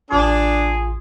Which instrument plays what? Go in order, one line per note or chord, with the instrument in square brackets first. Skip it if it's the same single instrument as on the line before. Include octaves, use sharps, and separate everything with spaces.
[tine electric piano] A1 F4 C6 [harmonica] D4 [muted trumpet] G#4